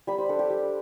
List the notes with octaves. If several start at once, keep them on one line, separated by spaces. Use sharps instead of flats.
G3 B5
C5
D4 A4
G4
G3